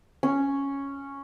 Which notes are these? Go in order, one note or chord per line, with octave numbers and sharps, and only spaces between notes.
C#4